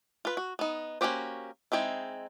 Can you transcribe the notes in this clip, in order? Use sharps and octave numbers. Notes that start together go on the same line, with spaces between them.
F4 B4
F#4
B3 D#4
A#3 C#4 F#4 G4 C5
G#3 C4 D#4 E4